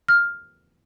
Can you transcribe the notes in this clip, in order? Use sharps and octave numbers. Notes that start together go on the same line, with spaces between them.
F6